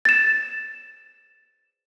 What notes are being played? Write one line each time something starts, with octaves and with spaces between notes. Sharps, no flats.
A6 E7